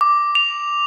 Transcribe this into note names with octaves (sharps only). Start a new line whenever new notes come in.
D6
F7